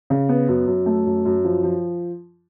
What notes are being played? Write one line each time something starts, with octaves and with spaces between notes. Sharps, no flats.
C#3
B3
F#2
F#2
A3
F#2
F#2
F3
F3